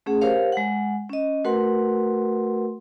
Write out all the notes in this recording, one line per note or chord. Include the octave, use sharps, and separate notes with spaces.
A3 C#4 G#4 F#5
G4 A#4 C5 C#5 F5
G#3 F#5
C#4 D#5
A3 F#4 A#4 B4 F#5 C6